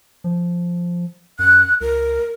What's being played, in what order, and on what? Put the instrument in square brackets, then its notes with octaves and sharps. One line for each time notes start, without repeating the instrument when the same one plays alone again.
[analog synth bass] F3
[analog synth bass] F#2 [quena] F#6
[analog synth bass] C#2 [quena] A#4